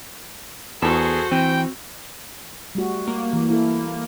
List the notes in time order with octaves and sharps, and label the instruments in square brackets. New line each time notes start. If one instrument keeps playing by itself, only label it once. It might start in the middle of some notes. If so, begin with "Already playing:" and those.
[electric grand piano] E2 [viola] F#4 C5 [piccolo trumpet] G#4 [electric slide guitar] A4
[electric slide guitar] E3 [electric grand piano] C4 [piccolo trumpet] G5
[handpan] G3 A3 F#4
[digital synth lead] A#3
[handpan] E3
E4 A4